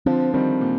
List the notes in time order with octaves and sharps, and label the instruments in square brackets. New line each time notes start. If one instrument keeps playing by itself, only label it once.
[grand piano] D3 F3 [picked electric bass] C4
[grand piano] D#3 G3 [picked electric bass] C4
[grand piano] A#2